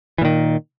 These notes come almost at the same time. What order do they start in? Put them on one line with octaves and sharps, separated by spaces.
E3 A#2 D#3